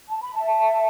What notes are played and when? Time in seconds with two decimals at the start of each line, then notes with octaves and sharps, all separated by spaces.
0.09 A5
0.21 B5
0.34 E5 A5